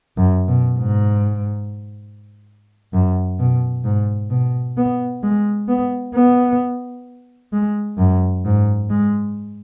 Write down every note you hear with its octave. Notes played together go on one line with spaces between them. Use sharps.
F#2
B2
G#2
F#2
B2
G#2
B2
B3
G#3
B3
B3
G#3
F#2
G#2
G#3